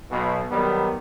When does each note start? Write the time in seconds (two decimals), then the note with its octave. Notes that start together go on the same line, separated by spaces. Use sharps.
0.11 B1 B2
0.51 D#3 F#3 G3 B3